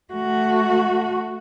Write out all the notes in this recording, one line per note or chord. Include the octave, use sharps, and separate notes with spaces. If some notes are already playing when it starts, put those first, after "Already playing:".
A3 F#4